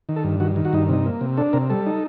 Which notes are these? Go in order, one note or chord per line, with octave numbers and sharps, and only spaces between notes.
D#3
A4
G2
D#3 F#4
D#3
F#4
G2 D#4
C3 D#4
A#3
C3
D4 A4
C3 A#4
G3 A4
D#4